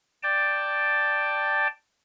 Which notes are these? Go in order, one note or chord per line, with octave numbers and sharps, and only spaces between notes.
D5 G5 A5